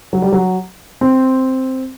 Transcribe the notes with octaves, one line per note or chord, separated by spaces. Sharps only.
F#3
G3
F#3
C4